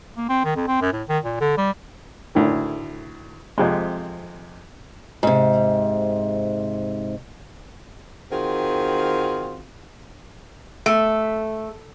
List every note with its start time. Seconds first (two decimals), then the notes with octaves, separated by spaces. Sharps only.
0.17 A#3
0.29 C4
0.45 D#3
0.56 F2
0.68 C4
0.81 F#2
0.93 A2
1.09 D#3
1.24 A#2
1.40 D3
1.58 G3
2.35 D2 A2 D#3
3.58 F2 C3 G#3
5.23 G#2 C3
8.31 D#3 C4 F4 F#4 G#4
10.86 A3